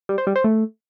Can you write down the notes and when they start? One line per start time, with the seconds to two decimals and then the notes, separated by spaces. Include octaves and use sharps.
0.09 G3
0.18 C5
0.27 G3
0.36 C5
0.44 A3